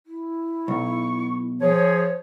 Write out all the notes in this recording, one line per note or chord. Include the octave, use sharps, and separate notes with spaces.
E4
B1 C#6
F3 G#4 C5 C#5